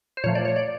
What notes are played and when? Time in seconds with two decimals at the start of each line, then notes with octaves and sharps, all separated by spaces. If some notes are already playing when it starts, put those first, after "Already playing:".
0.17 C5
0.24 A#2 F3 A3 C#5
0.35 D5
0.45 C#5
0.56 D5